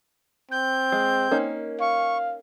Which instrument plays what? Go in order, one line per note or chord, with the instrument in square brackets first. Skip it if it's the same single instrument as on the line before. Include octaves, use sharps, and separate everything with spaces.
[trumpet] C4 [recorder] G6
[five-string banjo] G#3
A#3 C#4 D#4
[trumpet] F5 [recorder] C#6